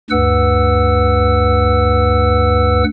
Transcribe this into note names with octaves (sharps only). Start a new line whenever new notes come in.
D2 G2 B4 F#5 E6